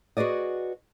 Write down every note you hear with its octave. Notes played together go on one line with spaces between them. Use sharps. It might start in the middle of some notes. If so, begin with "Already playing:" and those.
F#4 G#4 B4 D5 D#5